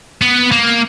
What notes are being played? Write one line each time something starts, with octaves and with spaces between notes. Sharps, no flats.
B3
A#3